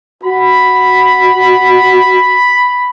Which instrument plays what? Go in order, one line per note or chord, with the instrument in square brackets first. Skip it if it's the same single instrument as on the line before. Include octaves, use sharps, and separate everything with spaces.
[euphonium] F#4 [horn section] B5